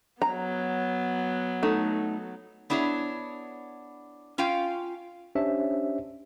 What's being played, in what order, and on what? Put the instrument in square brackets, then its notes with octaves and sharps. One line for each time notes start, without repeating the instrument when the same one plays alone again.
[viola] F#3 B3 [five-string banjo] A#5
[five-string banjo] A3 D#4
[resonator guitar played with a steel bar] B3 D4 E4 G#4 C#5
C#4 F4 F5 G5
[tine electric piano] C#4 D4 G4 C5 C#5 E5